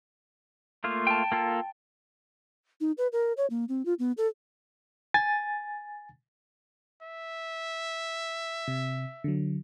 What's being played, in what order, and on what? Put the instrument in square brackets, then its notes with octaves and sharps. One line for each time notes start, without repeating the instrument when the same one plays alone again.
[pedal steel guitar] A3 A#3 F4
[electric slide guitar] G5 A5
[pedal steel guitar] A#3 F4 A4
[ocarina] D#4
B4
A#4
C#5
A#3
C4
F4
B3
A4
[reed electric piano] G#5 A6
[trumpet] E5
[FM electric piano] C3
D3 F#3